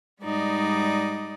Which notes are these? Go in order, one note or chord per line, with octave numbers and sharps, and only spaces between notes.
G#2 G3 D#4 D5 D#5